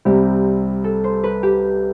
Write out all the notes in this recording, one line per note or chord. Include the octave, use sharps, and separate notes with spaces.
C2 C3 G3 C4 G4
A4
C5
B4
G4